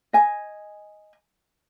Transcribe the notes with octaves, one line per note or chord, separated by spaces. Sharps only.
D#5 G#5